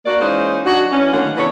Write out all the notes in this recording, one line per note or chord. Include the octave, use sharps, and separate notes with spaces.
A#3 F#4 D5
E3 G#3 A#3 C#4 D#4 C5
F#3 D4 D#4 F#4
E3 C#4
A2 D3 D#3 F#3 A#3 F#5
C#3 E3 B3 A4 C#5 D5